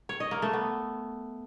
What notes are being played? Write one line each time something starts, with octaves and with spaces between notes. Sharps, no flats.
C#5
D#5
A#3
A3
B3